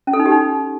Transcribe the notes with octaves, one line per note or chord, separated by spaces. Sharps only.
C#4
A4
D#4
G4
D#4